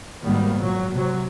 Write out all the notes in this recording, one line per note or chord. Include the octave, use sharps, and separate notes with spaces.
G#1 D#3 G3 A#3 B3
A#2 F#3
C3 F#3